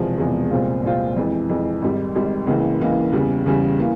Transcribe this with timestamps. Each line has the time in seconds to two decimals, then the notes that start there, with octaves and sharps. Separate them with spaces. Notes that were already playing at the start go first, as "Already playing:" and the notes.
Already playing: E1 E2 C3 F3 G#3
0.18 E1 E2 C3 F3 G#3
0.50 C2 A#2 G#3 C4 F4
0.83 C2 A#2 G#3 C4 F4
1.16 F2 E3 G#3
1.49 F2 E3 G#3
1.82 G#1 G#2 G3
2.15 G#1 G#2 G3
2.47 C#2 C#3 E3 A#3
2.80 C#2 C#3 E3 A#3
3.12 E2 C#3 G3
3.46 E2 C#3 G3
3.79 E3 A#3